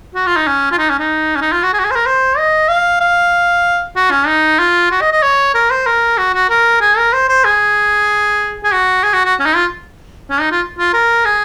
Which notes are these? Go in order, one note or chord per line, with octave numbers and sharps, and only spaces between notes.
F#4
F4
D#4
C#4
F4
D#4
C#4
D#4
C#4
D#4
F4
F#4
G#4
F#4
G#4
C5
A#4
C5
D#5
F5
F5
F#4
C#4
D#4
F4
F#4
D#5
D#5
C#5
A#4
C5
A#4
F#4
F#4
A#4
G#4
A#4
C5
C5
G#4
G#4
F#4
G#4
F#4
F#4
C#4
D#4
F4
C#4
D#4
F4
F4
A#4
G#4